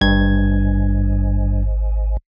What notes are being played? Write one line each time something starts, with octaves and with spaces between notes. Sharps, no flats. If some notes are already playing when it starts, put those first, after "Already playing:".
G#1 G2 G#6